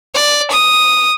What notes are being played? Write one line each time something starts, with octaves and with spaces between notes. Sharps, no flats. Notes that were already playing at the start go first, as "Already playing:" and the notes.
D5
D#6